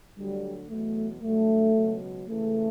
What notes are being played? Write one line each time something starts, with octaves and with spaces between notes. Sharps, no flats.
D2 D3 F#3 G3
E2 B2 F#3 A3
G2 D3 F#3 A3
C#2 B2 F#3
C#2 C#3 E3 A3